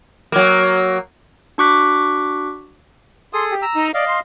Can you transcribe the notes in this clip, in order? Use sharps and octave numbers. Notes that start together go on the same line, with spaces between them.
F#3 A#3
D4 F#4 C#6 D6 F#6 B6
G#4 A4 C6 D#6
G4
A#5 E6
D#4
D5 D#5 F5
C6